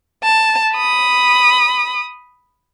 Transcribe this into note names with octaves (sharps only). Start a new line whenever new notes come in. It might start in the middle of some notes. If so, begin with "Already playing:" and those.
A5
B5 D#6